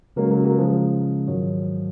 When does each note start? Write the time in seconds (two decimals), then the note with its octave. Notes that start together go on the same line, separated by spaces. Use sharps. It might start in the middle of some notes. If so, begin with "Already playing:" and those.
0.16 C#3 F#3 G#3 A#3 C#4
0.31 F#3 A#3
0.44 F#3 A#3
0.58 F3 G#3
1.28 G#2 D#3 F#3